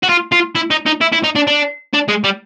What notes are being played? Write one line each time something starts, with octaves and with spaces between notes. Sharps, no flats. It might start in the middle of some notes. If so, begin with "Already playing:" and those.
F#4
F4
F4
E4
D#4
D#4
E4
E4
D#4
D4
D4
D4
G#3
G3